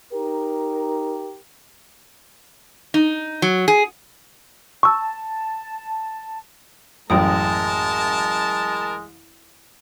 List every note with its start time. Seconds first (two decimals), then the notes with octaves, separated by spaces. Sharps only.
0.13 D#4 G4 A#4
2.94 D#4
3.42 F#3
3.68 G#4
4.83 A5 C#6 E6
7.10 A1 F#2 G#3 A#4 G5 A5 D#6